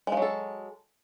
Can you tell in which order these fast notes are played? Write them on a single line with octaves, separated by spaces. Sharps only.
G#3 F3 F#3 A4